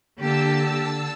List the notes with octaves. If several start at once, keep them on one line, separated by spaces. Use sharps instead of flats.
D3 A#3 G4 A5 E6